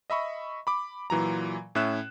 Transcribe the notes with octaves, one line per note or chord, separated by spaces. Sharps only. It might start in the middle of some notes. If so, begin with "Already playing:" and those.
D#5 E5 B5 C#6
B5 D6
A#2 E3 F#3 A#5
A2 C#4 E5 F#6 E7